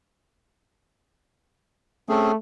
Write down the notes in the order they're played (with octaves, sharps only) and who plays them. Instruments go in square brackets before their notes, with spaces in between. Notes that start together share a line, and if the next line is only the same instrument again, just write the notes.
[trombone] A3 [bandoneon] C4 C#4 G#4